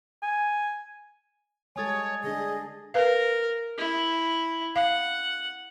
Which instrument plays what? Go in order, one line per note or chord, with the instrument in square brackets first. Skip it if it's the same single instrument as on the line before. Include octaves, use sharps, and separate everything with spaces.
[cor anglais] G#5
[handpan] G3 G#3 A4 [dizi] C#5 [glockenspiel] G#5 D#6 A6
[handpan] D3 D4 [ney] G#4 [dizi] D#5
[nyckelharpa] A#4 [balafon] B4 F5
[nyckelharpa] E4
[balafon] F5 [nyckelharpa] F#5